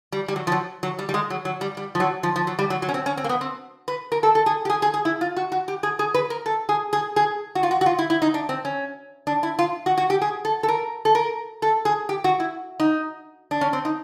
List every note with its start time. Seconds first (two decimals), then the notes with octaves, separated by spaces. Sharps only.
0.12 G3
0.28 G3
0.36 F#3
0.47 F3
0.52 F#3
0.83 F#3
0.99 G3
1.09 G3
1.14 G#3
1.30 F#3
1.45 F#3
1.61 G3
1.77 G3
1.95 F3
2.00 F#3
2.23 F3
2.36 F3
2.47 F#3
2.59 G3
2.70 F#3
2.82 F#3
2.89 C#4
2.94 C4
3.06 C#4
3.17 C4
3.24 A#3
3.29 B3
3.41 C4
3.88 B4
4.12 A#4
4.23 A4
4.35 A4
4.46 G#4
4.65 G4
4.70 G#4
4.82 G#4
4.94 G#4
5.05 E4
5.21 F4
5.37 F#4
5.52 F#4
5.68 G4
5.83 G#4
5.99 G#4
6.14 B4
6.30 A#4
6.46 A4
6.69 G#4
6.93 G#4
7.16 G#4
7.55 F#4
7.63 F4
7.71 F#4
7.81 F#4
7.86 F4
7.99 E4
8.10 E4
8.22 D#4
8.34 D4
8.49 C4
8.65 C#4
9.27 D4
9.43 E4
9.59 F4
9.86 F#4
9.98 F#4
10.10 G4
10.21 G#4
10.45 A4
10.63 A4
10.68 A#4
11.05 A4
11.15 A#4
11.62 A4
11.85 G#4
12.09 G4
12.24 F#4
12.40 E4
12.80 D#4
13.51 D4
13.61 C#4
13.73 C4
13.85 D#4